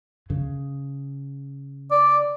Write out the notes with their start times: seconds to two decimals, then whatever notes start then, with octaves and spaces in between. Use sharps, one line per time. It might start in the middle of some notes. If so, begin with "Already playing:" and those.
0.30 C#3
1.91 D5